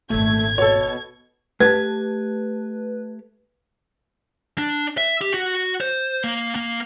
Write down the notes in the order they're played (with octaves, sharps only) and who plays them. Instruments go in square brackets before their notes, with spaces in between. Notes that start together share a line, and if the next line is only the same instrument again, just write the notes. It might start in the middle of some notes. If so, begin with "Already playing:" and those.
[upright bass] G#1 A#2 [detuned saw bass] A3 [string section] G#6
[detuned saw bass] B2 [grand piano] A4 C#5
[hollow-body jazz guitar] A3 G4 A5 [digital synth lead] B4 [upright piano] G#6
[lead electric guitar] D4
E5
G4
F#4
C5
A#3
A#3